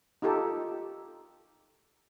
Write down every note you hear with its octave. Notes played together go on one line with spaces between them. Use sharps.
D#4 F4 G4 A4